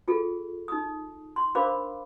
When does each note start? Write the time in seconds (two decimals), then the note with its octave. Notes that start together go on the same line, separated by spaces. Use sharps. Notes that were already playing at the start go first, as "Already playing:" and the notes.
0.08 F4 G#4 A4
0.68 D#4 D#6
1.36 C6
1.55 D4 A#4 C5 F5 B5 D6